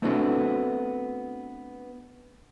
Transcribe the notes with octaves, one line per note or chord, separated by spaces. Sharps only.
A3 B3 C4 D4 F#4 A4